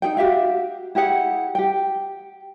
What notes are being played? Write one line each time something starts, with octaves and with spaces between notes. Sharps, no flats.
D#4 G#4 G5
F#4 G4 E5 F5
E4 G4 G#4 F#5
G4 G5